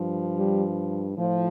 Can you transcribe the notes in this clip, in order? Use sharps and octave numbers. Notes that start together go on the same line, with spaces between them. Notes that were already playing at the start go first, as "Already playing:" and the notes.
Already playing: G2 F3
G3
A2 F3